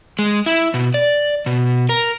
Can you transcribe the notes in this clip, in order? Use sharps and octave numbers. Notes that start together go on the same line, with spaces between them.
G#3
E4
B2
D5
B2
A#4